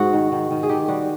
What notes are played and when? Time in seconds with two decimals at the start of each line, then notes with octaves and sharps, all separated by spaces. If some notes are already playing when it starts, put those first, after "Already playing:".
Already playing: G#2 F#4
0.13 D#3
0.32 D#3
0.51 D#3
0.63 G#4
0.69 D#3 G4
0.88 G3 F#4